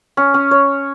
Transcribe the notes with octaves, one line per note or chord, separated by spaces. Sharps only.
C#4
C#4
C#5